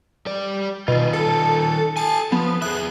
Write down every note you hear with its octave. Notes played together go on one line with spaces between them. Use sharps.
G3 D5
B2 D#3 F4
A4
A4 G#5 A5
F3 B3
E4 G#4 F#6